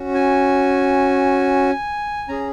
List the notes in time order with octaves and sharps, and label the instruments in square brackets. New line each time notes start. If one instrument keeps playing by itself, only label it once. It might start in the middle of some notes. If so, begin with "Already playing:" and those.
Already playing: [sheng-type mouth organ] C#4 F#4
G#5
C#4 G#4 A#5